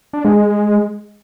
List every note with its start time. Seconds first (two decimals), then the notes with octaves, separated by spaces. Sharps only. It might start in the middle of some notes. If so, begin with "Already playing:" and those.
0.13 D4
0.25 G#3
0.36 G#3